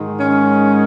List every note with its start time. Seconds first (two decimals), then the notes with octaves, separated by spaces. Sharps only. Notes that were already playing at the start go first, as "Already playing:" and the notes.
Already playing: G#2 D#3 G#3
0.18 C#4